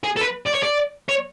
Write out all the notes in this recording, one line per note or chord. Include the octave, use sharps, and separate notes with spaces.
G#4
A4
B4
D5
C#5
D5
C#5